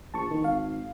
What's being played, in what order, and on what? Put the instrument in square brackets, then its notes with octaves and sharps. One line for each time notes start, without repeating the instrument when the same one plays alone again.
[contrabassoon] A#1 [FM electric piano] A5 C#6
[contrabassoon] D#3
[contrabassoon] G#1 [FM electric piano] F5